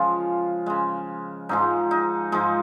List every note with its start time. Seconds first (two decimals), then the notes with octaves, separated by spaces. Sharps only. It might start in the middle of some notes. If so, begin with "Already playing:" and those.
Already playing: C#3 F3 G#3 F4
0.66 C#3 G#3
1.49 G#2 F3 G#3 D#4
1.91 D#4
2.32 G#2 F3 G#3 D#4